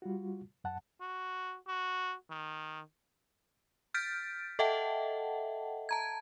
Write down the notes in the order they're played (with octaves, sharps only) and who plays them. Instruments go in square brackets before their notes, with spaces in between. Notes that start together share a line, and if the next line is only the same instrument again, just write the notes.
[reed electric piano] G3 F4 F#4
F#2 F#5 A5
[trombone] F#4
F#4
D#3
[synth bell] F6 G6 A6 B6 D7
A4 D#5 E5 F#5 G5 A5
A5 A#5 G#6